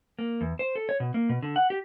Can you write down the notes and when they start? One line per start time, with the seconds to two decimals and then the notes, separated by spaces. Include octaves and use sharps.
0.19 A#3
0.41 E2
0.59 C5
0.76 A4
0.89 C#5
1.00 B2
1.14 A#3
1.29 B2
1.43 D3
1.56 F#5
1.70 G4